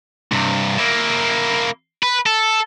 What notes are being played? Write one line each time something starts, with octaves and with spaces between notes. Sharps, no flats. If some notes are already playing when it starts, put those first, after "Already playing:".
G2 C3
A#3 E4
B4
A4